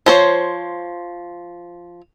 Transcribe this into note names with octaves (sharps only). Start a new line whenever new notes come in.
F3 C5 C#5